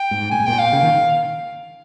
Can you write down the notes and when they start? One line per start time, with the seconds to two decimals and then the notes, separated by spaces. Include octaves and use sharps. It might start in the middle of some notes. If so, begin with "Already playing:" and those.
Already playing: G5
0.11 G#2
0.31 A#2 G#5
0.40 G#2
0.46 A#2 G5
0.59 F5
0.72 C#3
0.83 D#3